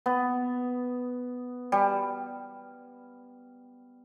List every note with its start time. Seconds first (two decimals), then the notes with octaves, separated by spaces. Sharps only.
0.06 B3
1.72 G3